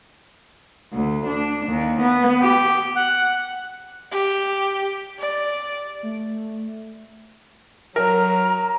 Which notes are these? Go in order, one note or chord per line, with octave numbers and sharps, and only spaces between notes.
D2
D4
D#2
B3
G4
F#5
G4
D5
A3
F#3 A#4 A#5